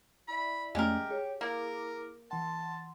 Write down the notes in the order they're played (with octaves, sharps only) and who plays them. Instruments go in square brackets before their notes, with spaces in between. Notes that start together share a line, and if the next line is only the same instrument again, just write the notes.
[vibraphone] E4 D5 E5 [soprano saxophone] B5
[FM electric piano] F2 A3 C#4 [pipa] G#3 A#4 [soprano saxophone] G4
[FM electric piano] G#4 [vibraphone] C#5
[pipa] A#3 [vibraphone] E4 D6 [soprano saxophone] A#4
[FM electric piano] E3 F#5 [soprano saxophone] A5 [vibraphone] C6